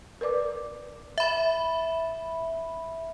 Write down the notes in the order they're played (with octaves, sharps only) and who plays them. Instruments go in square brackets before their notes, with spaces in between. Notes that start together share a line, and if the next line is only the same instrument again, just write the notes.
[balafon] A#4 B4 D5 D6
[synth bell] E5 B5